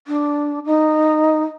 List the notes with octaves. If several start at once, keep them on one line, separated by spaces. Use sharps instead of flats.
D4
D#4